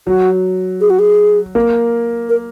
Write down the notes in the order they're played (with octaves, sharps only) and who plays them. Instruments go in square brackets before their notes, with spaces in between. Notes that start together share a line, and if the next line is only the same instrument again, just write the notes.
[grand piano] F#3 [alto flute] F#4
[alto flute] G#4
F#4
G#4
[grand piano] A#3
[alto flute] A#4